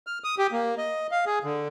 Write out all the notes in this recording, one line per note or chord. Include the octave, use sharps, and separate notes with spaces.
F6
D#6
G4
A#3
D#5
F5
G#4
D3